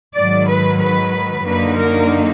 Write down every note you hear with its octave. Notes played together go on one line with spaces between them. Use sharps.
G#2 D#3 F#3 D5
B4
B4
F#2 D3 F#3 A#3 D#4 B4
A#4